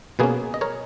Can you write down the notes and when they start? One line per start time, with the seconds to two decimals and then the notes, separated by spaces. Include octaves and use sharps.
0.19 B2 A#3 C#4 G#4 B4
0.54 D#5
0.61 A#4 C#5